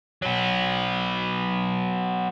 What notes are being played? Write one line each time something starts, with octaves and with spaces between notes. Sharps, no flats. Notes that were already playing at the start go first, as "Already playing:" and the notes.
F#3 B3